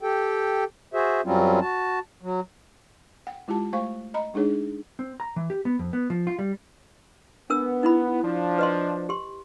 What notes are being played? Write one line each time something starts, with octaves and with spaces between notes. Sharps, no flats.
G4 A4 G5
F#4 G#4 C5 E5
F#2 F#3 G3 C4 C#4 F4
F#4 A5
F#3
F#5 G5
G#3 E4 F4 G4 A5
A3 C5 F5 C#6
D#5 A#5 B5
G#3 D4 D#4 G#4 C#5
C4
A#5
E3
G4
B3
F2
B3
F3
F4
G3
B3 D4 A#4 E6
D#4 E4 B5
F3 D4
B4 D#5 C6
G4 C6